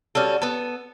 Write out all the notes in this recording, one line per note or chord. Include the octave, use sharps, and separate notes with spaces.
G3 C#4 F#4 A4
B3 A4